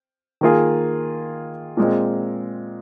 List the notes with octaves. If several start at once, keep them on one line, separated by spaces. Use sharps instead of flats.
D#3 A#3 F4 G#4
A#2 G#3 C4